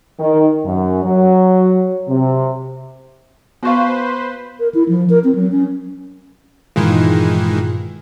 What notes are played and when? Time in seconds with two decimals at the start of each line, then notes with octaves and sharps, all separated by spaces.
0.19 D#3
0.65 F#2
1.04 F#3
2.08 C3
3.63 B3 F#4 B4 C5 F5 C#6
4.60 A#4
4.75 E4
4.89 F3
5.10 A#4
5.24 C4
5.35 F#3
5.52 C#4
6.76 G2 A#2 D#3 E3 G#3 F4